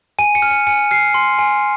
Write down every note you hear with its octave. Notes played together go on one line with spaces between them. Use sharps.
G#5 D#7
C#7
F6
C#7
G#5 C#7
F6 C7
C6
G#5